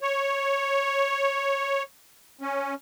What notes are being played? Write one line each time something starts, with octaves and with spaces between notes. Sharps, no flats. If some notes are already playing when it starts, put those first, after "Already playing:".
C#5
C#4